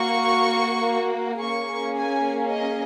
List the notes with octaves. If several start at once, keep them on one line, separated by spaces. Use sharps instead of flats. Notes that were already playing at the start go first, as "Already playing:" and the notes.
Already playing: A#3 F#4 C#6
A#3 C#4 G#4 C#6
G#5
D#5